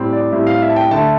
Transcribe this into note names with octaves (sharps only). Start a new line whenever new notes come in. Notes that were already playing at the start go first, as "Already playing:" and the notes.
Already playing: A2 G3 C4
D5
A2 G3 C4 E5
F5
E5
A5
G5
D3 A3 A5